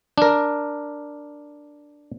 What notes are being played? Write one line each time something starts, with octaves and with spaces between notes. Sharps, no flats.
D4 A#4